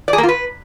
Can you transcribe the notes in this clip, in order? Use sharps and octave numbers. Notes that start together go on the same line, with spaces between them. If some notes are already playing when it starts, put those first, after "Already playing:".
D5
G#4
A#3
F4
B4